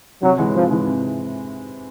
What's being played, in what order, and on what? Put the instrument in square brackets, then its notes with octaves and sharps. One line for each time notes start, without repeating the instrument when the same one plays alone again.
[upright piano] C3 [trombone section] F#3
[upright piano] E3 G#3
[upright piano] C3 [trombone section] F3
[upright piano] E3 G#3
C3